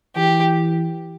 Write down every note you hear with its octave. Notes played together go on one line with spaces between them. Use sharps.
E3 G4